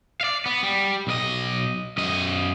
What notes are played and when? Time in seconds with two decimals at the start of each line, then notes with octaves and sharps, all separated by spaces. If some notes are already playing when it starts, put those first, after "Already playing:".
0.21 D5 F5
0.46 B3
0.63 G3
1.07 B1 D#5
1.98 F#2 D#5